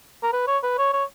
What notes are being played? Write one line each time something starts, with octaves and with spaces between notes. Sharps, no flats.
A#4
B4
C#5
B4
C#5
C#5